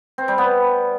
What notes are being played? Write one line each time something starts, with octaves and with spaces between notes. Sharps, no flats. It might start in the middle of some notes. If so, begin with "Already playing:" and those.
C4
G3
B3